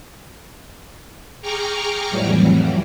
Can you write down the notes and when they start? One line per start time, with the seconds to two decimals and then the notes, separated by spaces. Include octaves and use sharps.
1.42 G#4 G5 A#5 C#6 D6 F6
2.10 F2 A2 E3 F#3 G3